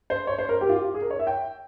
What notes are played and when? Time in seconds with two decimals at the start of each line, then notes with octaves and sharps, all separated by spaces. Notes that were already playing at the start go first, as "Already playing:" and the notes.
0.10 C5
0.27 C#5
0.38 C5
0.49 A#4
0.61 G4
0.69 F4
0.76 G4
0.94 G#4
1.02 A#4
1.10 C#5
1.19 E5
1.27 G5